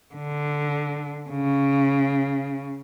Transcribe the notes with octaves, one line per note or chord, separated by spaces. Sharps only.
D3
C#3